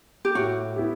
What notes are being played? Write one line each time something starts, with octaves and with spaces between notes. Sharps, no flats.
G4
A2 F#4
B3 E4 G4